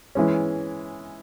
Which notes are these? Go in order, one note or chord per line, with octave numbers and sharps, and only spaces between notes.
E3 G#3 C#4